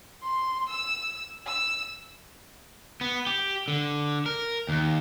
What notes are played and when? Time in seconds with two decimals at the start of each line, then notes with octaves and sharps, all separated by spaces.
0.22 C6
0.69 E6
1.46 E6
3.01 B3
3.27 G4
3.68 D3
4.26 A#4
4.69 D#2